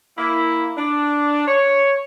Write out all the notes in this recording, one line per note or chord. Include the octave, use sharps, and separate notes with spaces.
A#3 E4
D4
C#5